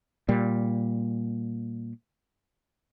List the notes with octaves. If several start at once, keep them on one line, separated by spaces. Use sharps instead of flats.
A#2 G3